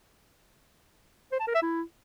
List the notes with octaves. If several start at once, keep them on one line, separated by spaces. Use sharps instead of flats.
C5
A5
A#4
E5
E4